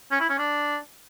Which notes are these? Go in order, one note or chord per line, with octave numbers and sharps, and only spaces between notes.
C#4
E4
C#4
D4